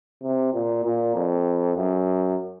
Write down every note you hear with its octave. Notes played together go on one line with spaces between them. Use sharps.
C3
A#2
A#2
F2
F#2